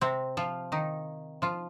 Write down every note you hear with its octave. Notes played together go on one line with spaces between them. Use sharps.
C3 C4
F3 F4
D#3 D#4
F3 F4